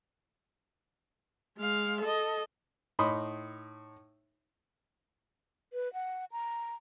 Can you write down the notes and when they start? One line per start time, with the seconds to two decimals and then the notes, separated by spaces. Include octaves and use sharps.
1.58 G#3 F5
2.01 A4 D#5
2.99 A2 D#4 B5 C6 D#6
5.73 B4
5.93 F#5
6.32 A#5